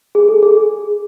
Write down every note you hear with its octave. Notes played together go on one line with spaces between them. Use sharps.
G#4
A4
G#4